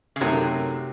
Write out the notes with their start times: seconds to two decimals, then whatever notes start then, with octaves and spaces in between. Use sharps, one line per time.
0.16 C#3
0.21 F#2 C3 D#3 F#3 A3